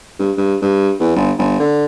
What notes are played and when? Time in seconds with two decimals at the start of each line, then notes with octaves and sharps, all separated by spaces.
0.19 G2
0.37 G2
0.62 G2
1.00 E2
1.16 G1
1.38 G1
1.59 D3